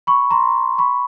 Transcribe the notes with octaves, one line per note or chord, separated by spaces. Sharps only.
B5 C#6
A#5 C6
B5 C#6